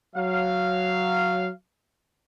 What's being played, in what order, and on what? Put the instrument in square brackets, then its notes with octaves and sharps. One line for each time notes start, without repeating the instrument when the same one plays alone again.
[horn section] F#3 F5